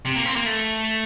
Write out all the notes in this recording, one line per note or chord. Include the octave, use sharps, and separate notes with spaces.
C3
A#3
C4
A#3
A3